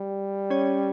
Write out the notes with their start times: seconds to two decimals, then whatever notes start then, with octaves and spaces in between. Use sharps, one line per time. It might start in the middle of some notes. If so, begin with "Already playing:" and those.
Already playing: G3
0.50 C#4 C#5